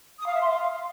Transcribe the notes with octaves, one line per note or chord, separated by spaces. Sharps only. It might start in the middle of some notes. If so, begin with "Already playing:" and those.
D#6
F5
E5
C6
F5